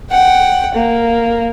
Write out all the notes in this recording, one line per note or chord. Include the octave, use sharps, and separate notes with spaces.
F#5 G5
A#3